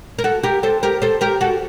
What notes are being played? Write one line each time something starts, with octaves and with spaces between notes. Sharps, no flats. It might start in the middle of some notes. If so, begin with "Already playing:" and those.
A#4
F#4 A4
G4 A#4
A4 C5
G4 A#4
A4 C5
G4 A#4
F#4 A4